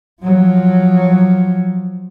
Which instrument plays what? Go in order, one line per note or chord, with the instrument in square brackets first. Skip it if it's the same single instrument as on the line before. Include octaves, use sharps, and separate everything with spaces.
[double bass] F3 F#3